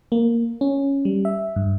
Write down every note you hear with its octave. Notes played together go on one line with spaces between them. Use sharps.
A#3
C#4
G3
E5
G2